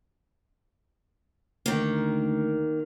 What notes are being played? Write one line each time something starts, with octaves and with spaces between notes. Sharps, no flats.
D2 D#3 A#3